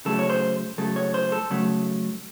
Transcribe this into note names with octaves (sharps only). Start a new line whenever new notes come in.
C#3 F#3 A3 A4
C#5
C5
C#3 F#3 A3 A4
C#5
C5
A4
C#3 F#3 A3